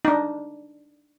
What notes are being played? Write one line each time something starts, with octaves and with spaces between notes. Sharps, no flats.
D4 D#4